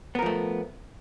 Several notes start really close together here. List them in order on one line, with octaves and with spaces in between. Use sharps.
B3 A#4 F3 A3